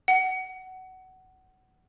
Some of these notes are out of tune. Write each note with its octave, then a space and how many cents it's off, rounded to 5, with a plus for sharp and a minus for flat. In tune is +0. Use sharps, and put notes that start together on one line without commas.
F#5 +20